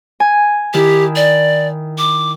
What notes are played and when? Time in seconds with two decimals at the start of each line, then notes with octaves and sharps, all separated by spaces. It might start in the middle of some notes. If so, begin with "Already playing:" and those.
0.20 G#5
0.74 D#3 E4 G4
1.16 D5
1.98 D6